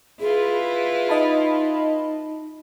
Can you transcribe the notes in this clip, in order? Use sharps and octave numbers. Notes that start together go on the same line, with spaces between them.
E4 F4 G#4 B4
D#4 D#5 A5 B5